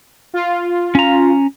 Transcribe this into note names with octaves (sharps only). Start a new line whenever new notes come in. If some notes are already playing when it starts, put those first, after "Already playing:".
F4
C#4 A#5